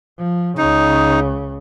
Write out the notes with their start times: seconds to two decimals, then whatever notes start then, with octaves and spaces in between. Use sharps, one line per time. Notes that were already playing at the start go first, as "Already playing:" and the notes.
0.19 F3
0.57 C#2 C#3 D#4